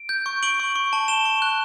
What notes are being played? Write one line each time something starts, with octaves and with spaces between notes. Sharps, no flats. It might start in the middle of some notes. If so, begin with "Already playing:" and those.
Already playing: D7
G6
C#6
C#6 D7 F#7
C#6
C#6
A5
A5 E7 G7
C#6
F#6